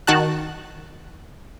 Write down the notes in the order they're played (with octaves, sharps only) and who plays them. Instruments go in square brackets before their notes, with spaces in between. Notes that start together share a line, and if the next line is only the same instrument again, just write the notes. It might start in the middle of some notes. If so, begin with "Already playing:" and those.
[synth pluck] D#3 F#4 A5 F#6